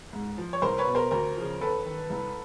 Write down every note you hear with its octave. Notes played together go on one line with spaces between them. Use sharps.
G#2
F3
C#5
C2 A#4 C5
B4 C#5
B2
A#4 C5
D2 A#4 C5
C#3 F3
D#2 A4 B4
D#3
C2